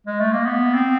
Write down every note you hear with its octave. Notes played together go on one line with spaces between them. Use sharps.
G#3
A3
A#3
B3
C4